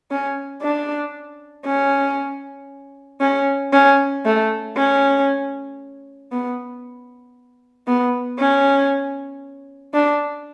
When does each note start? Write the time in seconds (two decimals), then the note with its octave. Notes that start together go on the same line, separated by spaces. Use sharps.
0.11 C#4
0.62 D4
1.65 C#4
3.21 C#4
3.73 C#4
4.25 A3
4.76 C#4
6.32 B3
7.87 B3
8.39 C#4
9.94 D4